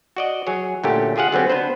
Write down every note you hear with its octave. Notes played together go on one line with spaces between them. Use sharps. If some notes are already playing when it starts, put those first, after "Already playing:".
F#4 D5 D#5
F#3 G#4 C#5
A#2 D3 A3 C#4 F#4 G4
F4 G4 G#4 F5 F#5
D3 F#3 B3 C4 G4
B3 D4 B4 C5